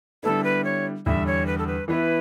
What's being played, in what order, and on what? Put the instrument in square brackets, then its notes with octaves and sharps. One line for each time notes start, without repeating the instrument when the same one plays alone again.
[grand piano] D3 G3 B3 E4 [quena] A4
[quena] B4
C#5
[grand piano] E2 D3 G3 [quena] E5
[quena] C#5
B4
A4
B4
[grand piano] E3 B3 E4 [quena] B4